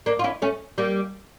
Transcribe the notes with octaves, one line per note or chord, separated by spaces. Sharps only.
A#3 D4
F4
C#4 E4
A3 C#4
G3 A#3